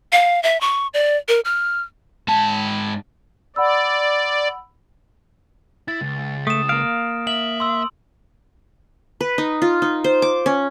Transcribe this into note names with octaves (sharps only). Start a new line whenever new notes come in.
F5
E5
C#6
D5
A#4
F6
G#2 A5
D5 F#5 B5 E6
E4 A6
C#2
A3 D#6 E7
A#3 F5 D7
E5 F#7
C6 E6
B4
D#4
F4
D#4
C5
D6
C#4